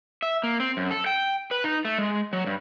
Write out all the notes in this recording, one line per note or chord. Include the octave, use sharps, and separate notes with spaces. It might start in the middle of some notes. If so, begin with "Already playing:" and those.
E5
A#3
C4
F#2
A4
G5
B4
D#4
A3
G#3
F#3
G2